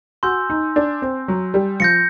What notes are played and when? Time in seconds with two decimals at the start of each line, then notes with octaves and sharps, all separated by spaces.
0.23 F#4 G#5 C6 E6 G6
0.50 D#4
0.76 D4
1.02 C4
1.28 F#3
1.54 G3
1.80 F3 G6 A#6 C#7